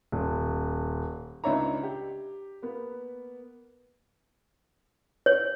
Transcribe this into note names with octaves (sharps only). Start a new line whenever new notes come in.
D#1
C#2 D4 D#4 C#5 E5 A#5
G4
A#3 B3 B4
C#5